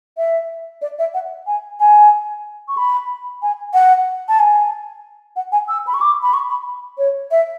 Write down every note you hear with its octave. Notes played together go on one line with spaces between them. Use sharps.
E5
D5
E5
F#5
G#5
G#5
C#6
B5
G#5
F#5
A5
G#5
F#5
G#5
E6
B5
C#6
D6
B5
C#6
B5
C#5
E5